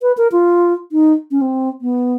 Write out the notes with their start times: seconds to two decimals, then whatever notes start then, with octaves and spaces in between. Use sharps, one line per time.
0.02 B4
0.17 A#4
0.32 F4
0.92 D#4
1.31 C#4
1.41 C4
1.81 B3